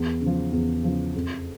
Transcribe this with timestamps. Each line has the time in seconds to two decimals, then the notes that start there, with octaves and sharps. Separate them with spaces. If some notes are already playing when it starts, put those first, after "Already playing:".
Already playing: E2
0.21 C#3
0.26 F3
0.53 E2
0.84 C#3 F3
1.15 F2